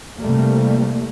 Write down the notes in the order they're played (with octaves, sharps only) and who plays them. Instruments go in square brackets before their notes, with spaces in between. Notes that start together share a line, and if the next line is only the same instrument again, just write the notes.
[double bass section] C3 E3 G3 A3 A#3